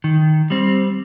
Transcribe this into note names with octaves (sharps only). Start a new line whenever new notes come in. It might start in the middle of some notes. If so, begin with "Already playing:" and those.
D#3
G3 C4